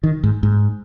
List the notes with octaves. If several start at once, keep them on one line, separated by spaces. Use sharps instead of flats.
D#3
G#2
G#2